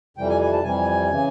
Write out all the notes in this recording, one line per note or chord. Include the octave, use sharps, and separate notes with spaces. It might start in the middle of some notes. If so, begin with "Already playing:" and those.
F2 C3 E3 G3 G5
G#5
G#5
A5
F2 C3 E3 G3 G#5
C#3 E3